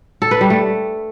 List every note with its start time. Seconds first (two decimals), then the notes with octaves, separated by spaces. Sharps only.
0.22 A4
0.31 B4
0.41 G3
0.50 A3